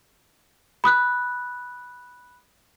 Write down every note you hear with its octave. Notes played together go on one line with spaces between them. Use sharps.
B5 D#6 F#6